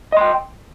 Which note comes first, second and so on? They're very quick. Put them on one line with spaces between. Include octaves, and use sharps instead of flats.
D#5 C6 G5